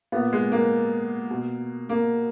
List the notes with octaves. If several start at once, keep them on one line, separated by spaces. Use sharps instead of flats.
A#2 B3
G#3
A#3
B2
A#3